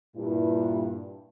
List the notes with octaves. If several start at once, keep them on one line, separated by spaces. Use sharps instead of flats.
G2 A#2 E4